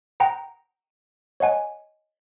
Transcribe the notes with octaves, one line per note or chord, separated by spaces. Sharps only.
F#5 G5 A#5
C#5 D#5 F#5 G#5